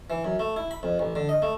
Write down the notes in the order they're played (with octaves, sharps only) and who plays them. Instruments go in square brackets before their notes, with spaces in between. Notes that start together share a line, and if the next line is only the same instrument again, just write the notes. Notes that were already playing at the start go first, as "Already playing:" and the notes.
[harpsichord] E3
F#2
A3
E4
B5
F2
A1
D3
D#5
A3